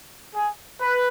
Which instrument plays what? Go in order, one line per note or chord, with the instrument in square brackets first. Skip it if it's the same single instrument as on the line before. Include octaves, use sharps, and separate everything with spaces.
[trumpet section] G#4
B4